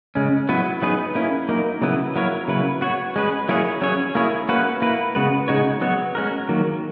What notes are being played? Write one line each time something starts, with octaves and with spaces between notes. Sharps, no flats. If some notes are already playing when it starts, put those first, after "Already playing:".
C#3 G#3 C#4
F#3 B3 E4 B4
F#3 B3 D#4 G#4 B4
A#3 C#4 E4
F#3 A#3 D#4 A#4
C#3 F#3 B3 E4 B4
F#3 A#3 E4 A#4 C#5
C#3 F#3 A#3 E4 B4
B3 F#4 C#5
G#3 C#4 G#4 B4
F#3 A#3 E4 G#4 C#5
F#3 C#4 G#4 C#5
A#3 E4 G#4 C#5
A#3 C#4 F#4 B4
A#3 E4 B4
C#3 G#3 B3 F#4 B4
C#3 G#3 D#4 F#4 C#5
F#3 B3 F#4 C#5
G#3 C#4 F#4 A#4
D#3 F#3 A#3